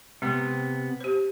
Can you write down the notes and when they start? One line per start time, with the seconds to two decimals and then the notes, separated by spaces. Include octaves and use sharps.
0.22 C3 G#3 B3
1.00 G4 C5